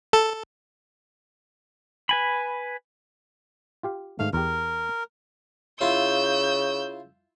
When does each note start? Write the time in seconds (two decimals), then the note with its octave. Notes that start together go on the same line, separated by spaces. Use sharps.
0.13 A4
2.09 B4 G#5 B5
3.83 F4 G4 F5
4.19 G#2 D#3 A3 F5
4.33 E2 G4 A#4
5.81 C#3 E4 F4 E6 G6